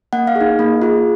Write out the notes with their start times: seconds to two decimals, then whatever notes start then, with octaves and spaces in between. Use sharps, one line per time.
0.13 A#3 F#5
0.27 F5
0.35 G#4
0.41 D#4
0.59 A#3
0.82 F4 G#4